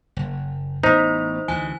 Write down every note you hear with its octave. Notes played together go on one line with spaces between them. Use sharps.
F#1
A1 B3 D#4 C5
D2 E3 G#5